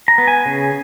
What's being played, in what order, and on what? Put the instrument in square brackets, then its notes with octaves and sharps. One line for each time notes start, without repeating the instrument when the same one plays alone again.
[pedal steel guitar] A#5
B3
G#5
C#3